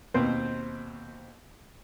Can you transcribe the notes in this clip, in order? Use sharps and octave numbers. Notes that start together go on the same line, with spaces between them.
D#2 B2 C4 C5